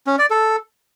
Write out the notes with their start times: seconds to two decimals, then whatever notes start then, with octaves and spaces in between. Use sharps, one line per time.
0.07 C#4
0.19 D5
0.30 A4